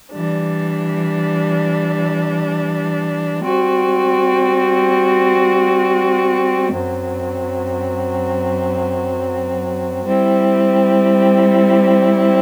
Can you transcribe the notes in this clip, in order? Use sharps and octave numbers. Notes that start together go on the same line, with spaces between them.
E3 G3 D4
G3 C4 F#4
F#2 F#3 C4
G3 C4 E4